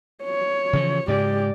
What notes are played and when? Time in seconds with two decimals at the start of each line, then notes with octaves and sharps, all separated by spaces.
0.24 C#5
0.73 C#3 E3 F3
1.08 G#2 C#3 G#3 G4 D5